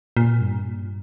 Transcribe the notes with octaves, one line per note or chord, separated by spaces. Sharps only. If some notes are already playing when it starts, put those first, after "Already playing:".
A#2
G2